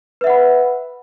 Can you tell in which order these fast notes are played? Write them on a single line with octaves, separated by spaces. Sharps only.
B4 E5 F#5 B5